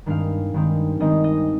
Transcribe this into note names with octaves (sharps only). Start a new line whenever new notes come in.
G2 D#3 G#3 C4 D#4 F5
G2 D#3 G#3 C4 D#4
G2 D#3 G#3 C4 D#4 D#5
D#5